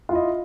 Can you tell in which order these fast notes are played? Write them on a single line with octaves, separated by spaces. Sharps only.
F4 E4 D#5